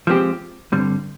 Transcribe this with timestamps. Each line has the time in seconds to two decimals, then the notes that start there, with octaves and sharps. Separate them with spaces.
0.07 F3 G#3 C4 G4
0.72 G2 D3 G3 C4